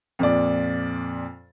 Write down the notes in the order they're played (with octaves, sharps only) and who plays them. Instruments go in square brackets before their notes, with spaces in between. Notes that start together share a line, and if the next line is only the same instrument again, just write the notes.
[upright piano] F2 A#2 D5